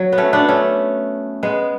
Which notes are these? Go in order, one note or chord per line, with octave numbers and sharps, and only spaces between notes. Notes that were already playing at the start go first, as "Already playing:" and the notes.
Already playing: F#3
B3
A3 C#4
B3 D4
A3 C#4
G#3 B3